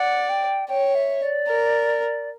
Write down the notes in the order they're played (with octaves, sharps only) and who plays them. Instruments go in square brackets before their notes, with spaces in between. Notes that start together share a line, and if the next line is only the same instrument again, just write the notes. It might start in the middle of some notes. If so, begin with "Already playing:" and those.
Already playing: [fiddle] D5 [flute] F#5
[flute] G5
[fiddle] C#5 [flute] G5
[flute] E5
D5
[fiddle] A#4